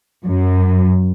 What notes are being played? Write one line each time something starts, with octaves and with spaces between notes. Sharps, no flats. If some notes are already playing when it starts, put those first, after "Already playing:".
F#2